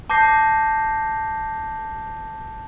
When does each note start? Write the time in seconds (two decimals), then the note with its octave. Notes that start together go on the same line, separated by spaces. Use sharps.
0.10 A5 D6 G6 A#6 C7